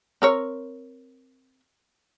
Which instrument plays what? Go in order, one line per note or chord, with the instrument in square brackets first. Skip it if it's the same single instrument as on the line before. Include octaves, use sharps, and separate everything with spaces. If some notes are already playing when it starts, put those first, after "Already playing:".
[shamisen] C4 A#4 C#5